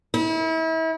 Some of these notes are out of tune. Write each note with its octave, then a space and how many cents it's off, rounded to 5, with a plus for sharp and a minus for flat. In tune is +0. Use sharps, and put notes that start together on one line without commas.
E4 -35